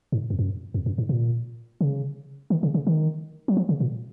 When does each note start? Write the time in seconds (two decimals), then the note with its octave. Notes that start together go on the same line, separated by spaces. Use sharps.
0.12 G#2
0.30 F2
0.39 F#2
0.74 F2
0.86 F#2
0.98 G#2
1.09 A#2
1.81 C#3
2.50 D#3
2.63 C#3
2.74 C#3
2.87 D#3
3.48 F#3
3.57 F3
3.69 C#3
3.80 A#2